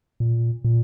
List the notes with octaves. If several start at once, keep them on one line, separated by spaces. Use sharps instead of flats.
A#2
A#2